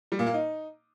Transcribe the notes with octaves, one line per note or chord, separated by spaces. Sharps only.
G3
A#2
A#3
D#4